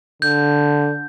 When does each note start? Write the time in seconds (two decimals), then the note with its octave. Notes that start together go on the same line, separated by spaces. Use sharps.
0.22 D3 G6